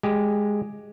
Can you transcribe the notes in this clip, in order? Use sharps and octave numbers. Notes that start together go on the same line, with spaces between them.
G#3 G4